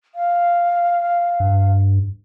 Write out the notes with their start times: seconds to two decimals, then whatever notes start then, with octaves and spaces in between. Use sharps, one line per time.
0.15 F5
1.40 G2